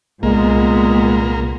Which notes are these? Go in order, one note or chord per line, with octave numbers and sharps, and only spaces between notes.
C2 A#2 G#3 A#3 B3